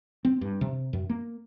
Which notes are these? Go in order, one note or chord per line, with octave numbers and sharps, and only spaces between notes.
C4
G2
C3
F#2
A#3